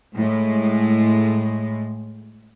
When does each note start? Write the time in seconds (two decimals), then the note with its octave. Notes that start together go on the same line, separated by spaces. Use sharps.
0.15 A2 G#3